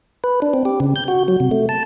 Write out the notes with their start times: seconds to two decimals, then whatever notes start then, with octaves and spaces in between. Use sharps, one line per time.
0.24 B4
0.42 D4
0.54 C4
0.65 G4
0.80 C#3
0.96 G6
1.08 F#4
1.28 F#3
1.40 C3
1.51 A3
1.69 A5